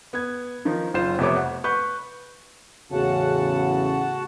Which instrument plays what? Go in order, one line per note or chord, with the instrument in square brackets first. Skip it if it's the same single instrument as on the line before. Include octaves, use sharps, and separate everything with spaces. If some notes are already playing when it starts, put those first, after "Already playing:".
[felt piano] B3 G#6
D#3 F3 D#4
F#1 F4 C5 E7
F2 C3 A3 B3 C#5 D6
F#5
B4 C#6 G6
[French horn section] E2 A2 C#3 [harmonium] F#4 F#5 A5